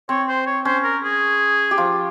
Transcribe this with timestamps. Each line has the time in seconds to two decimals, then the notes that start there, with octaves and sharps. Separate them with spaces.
0.09 C4 C#5
0.28 C5
0.46 C#5
0.65 C#4 C5
0.84 A#4
1.03 G#4
1.71 G4
1.77 F3 F4